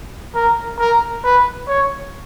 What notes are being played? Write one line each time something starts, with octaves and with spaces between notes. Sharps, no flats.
A#4
A#4
B4
C#5